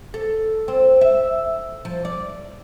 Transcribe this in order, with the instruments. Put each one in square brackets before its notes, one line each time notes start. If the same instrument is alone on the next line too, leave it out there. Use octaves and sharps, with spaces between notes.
[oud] A4
C4
E5
F3
D5